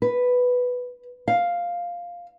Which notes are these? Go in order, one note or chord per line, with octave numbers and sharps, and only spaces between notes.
B4
F5